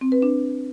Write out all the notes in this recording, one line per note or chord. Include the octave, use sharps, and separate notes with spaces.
C4
B4
D4